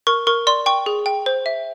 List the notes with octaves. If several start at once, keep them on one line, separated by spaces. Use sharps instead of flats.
A#4 C#6
A#4 C#6
D5 C6
G5 C#6
G#4
G5
C5
E5